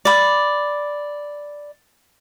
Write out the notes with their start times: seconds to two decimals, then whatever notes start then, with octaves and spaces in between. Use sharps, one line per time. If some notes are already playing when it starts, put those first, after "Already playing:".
0.05 D5 B5